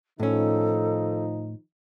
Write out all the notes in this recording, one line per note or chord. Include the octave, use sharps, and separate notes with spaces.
A2 D#3 F3 C#4 D#4 A4